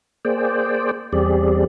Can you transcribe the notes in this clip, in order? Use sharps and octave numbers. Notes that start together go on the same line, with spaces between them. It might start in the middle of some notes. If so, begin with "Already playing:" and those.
A#3 G#4 C5 D5 G5
E2 G3 C4 G4 G#4 D5